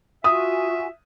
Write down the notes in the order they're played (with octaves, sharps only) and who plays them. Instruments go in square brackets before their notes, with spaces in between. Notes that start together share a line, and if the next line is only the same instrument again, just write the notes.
[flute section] F4 F#4 G#5 [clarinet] E5 [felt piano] D#6